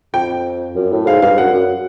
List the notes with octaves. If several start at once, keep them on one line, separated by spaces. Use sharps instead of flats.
F2 G5
F#2
A2
G#2 F5
G2 F5
F#2 F#5
F#2